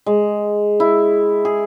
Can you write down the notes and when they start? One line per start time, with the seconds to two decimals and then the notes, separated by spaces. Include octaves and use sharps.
0.06 G#3
0.80 E4
1.45 G#4